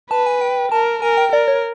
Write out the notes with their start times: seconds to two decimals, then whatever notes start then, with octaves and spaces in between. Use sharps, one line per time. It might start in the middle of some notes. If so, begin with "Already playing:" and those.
0.11 B4 A5
0.26 G#5
0.41 G5
0.72 A#4 A5
1.02 A#4 G#5
1.17 G5
1.32 A#4 D5
1.48 C#5